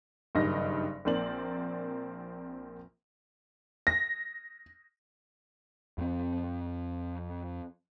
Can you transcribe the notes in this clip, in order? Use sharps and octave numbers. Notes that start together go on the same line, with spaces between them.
F#1 G2 D#3 D#5 A#6
A#1 A#3 C4 D5 F#7
A#6
F2 C4